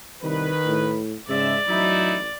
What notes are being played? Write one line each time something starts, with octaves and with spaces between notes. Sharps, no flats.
C2 D#3 B4
A2
G#2 C#3 D5 E5
A1 F#3 D#4 E4